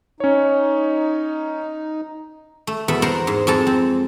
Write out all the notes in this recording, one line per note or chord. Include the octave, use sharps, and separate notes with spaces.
C#4 D#4 C#5
A3
E2 B2 A4 E5 B5
A#4 C5 D5 F#5 A#5 C6
G#2
F2 G#3 A4 A5 A#5
C4